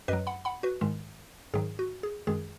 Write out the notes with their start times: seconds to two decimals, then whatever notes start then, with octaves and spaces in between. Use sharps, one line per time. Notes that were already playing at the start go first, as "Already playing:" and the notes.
0.08 F#2 F#3 B4 D#5
0.27 F#5 B5
0.45 F#5 B5
0.63 F#4 B4
0.81 G#2 D#3 G#3
1.54 G#2 D#3 F#3 G#4
1.79 F#4
2.03 G#4
2.27 F#2 D#3 G#3 G#4